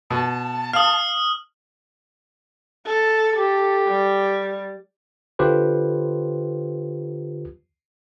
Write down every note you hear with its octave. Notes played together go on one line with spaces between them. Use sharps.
B2 A5
F5 D#6 F6
A4
G4 A4
G3
D3 F4 G4 B4 C5